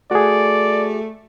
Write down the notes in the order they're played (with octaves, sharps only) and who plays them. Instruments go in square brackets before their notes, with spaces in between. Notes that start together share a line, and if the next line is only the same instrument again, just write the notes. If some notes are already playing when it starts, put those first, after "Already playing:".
[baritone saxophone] A3 [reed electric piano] F#4 G#4 [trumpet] D5